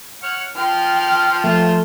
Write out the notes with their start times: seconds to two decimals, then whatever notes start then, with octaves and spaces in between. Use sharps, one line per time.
0.23 C#5 F#5 F6
0.56 F3 F4 G5 F6
1.44 F3 A3 F4 C5